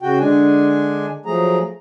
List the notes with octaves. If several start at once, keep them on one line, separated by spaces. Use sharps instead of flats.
C#3 F#4 G5
D3 G#3 D4 G#5
F3 F#3 A3 G#4 A#5